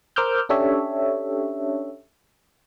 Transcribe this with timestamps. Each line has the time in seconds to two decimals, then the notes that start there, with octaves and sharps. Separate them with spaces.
0.16 A#4 C5 D6 E6 F6 G6
0.49 C#4 D4 G4 A4 C#5 E5